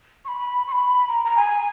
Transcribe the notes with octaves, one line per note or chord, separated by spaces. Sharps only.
C#6
B5
C#6
B5
A#5
A#5
G#5